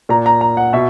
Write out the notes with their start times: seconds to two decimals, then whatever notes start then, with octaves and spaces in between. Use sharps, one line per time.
0.09 A#2 A#5
0.26 A#5
0.41 A#5
0.57 F#5
0.73 B2 E5